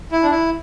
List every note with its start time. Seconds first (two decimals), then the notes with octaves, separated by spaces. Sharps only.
0.12 E4
0.23 D4
0.30 E4